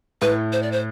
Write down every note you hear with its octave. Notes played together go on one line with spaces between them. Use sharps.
A2 B4
C5
D5
C5